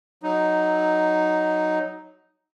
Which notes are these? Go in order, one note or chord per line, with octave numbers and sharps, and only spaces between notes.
F#3 D#4